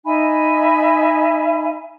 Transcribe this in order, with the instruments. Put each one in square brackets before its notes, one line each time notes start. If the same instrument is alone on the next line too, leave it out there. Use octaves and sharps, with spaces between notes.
[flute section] D#4 E5 G#5 B5